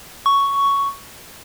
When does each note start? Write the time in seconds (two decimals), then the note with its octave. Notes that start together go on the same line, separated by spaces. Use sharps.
0.26 C#6